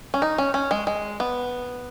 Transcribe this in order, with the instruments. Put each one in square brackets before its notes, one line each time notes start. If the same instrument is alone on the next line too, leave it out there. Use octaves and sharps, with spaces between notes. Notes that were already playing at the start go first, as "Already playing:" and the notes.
[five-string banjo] C#4
D#4
C#4
C#4
G#3
G#3
B3